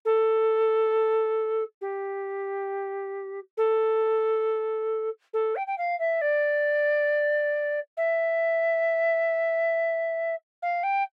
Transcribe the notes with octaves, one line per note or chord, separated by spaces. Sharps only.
A4
G4
A4
A4
G5
G5
F5
E5
D5
E5
F5
G5